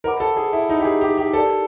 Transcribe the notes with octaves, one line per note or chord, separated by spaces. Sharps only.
A#4 C5 D#5 F#5 B5 D6
A4
G#4
E4
D#4
G4
G#4
G4
G4
G4 A4 A#4 D5